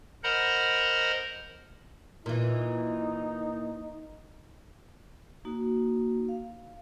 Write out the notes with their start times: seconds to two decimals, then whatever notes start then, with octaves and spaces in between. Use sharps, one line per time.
0.24 A#4 C5 D#5 F#5 A#5 B5
2.26 A#2 E3 D#4
5.45 A#3 D#4 F#4
6.29 F5